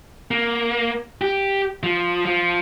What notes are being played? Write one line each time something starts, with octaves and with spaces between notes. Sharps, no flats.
A#3
G4
F3
F3